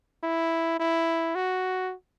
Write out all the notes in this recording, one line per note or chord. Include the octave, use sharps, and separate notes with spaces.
E4
E4
F#4